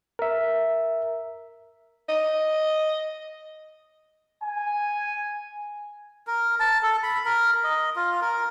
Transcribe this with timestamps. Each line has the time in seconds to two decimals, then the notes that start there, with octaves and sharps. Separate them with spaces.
0.19 A#4 E5
2.09 D#5
4.44 G#5
6.27 A#4
6.60 A5
6.83 A4
7.03 B5
7.25 A#4
7.64 D#5
7.96 F4
8.21 A#4